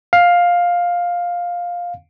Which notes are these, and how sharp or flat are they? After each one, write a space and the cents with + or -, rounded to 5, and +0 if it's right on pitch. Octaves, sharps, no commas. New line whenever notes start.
F5 +10